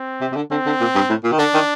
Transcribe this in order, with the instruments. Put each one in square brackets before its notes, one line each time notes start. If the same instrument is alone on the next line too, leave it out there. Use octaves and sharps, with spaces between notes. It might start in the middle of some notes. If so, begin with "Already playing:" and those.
Already playing: [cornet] C4
[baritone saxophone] C3
C3
D3
[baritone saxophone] D3 [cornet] C4
[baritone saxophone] D3
A#2
G2
A2
A#2
D#3
[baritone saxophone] D3 [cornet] D4
[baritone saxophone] D#3